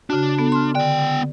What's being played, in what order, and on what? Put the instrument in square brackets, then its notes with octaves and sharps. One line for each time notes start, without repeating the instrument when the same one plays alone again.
[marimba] C#3 F#4 [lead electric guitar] D4
[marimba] B3 A4
C6 F6
[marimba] D3 D5 [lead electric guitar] B3 G5